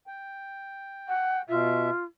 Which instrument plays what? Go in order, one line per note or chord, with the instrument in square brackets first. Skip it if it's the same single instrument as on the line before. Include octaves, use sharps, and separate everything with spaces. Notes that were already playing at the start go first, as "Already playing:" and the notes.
[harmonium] G5
[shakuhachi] F#5
[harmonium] B2 E5 [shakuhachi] F4